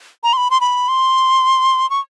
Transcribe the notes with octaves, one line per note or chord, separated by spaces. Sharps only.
A#5
C6
B5
C6
B5
C6
C#6